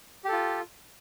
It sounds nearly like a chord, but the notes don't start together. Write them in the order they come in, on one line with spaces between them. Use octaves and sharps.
G4 A4 F4